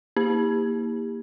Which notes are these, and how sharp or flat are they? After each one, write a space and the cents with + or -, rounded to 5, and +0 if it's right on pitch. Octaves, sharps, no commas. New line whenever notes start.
A#3 +0 E4 -40 G4 +30